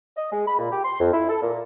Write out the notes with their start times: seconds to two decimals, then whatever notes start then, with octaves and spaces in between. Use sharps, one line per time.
0.17 D#5
0.31 G#3
0.47 B5
0.59 A#2
0.70 G4
0.84 C6
1.00 F2
1.13 E4
1.29 A4
1.42 A#2